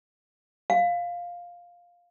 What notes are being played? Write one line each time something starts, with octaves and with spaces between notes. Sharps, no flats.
F5